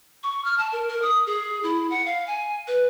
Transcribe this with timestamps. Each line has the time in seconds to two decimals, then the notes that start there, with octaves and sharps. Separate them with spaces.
0.23 C#6
0.45 F6
0.58 A5
0.72 A#4
0.88 A#4
1.02 D#6
1.27 G#4
1.63 E4
1.90 F#5
2.06 F5
2.27 G#5
2.67 B4